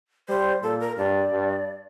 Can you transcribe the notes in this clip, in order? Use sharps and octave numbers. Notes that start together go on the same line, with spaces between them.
G3 C5
A#2 A4
A#4
G2 D5
G2